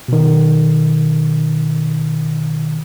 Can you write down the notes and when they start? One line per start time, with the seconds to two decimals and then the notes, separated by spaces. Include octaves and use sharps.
0.08 B2 D#3